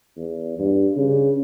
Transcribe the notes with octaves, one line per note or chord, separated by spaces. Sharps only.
E2
G2
C#3